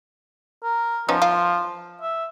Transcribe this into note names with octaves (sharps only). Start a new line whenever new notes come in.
A#4
F3 B3 C#4 D#4
F4
E5